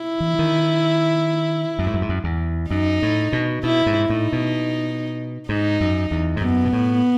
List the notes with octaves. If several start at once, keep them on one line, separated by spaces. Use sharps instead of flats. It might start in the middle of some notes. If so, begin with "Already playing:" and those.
Already playing: E4
E3
D#3
F#2
G#2
F#2
G#2
F#2
E2
F#2 D#4
A2
B2
B2 E4
G#2
A2 D#4
B2
G#2 D#4
F#2
E2
G#2
F#2 B3
B2
A2